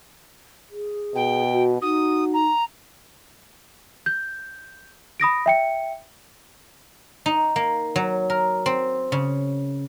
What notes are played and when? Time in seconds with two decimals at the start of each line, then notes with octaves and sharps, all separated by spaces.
0.71 G#4
1.15 B2 G5
1.52 F#4
1.81 D#4 F#4 D#6
2.33 A#5
4.06 G6
5.20 B5 D#6 A#6 D7
5.46 E5 G5 C#7
7.26 D#4
7.56 A#3
7.96 F#3
8.30 A#4
8.66 C4
9.12 C#3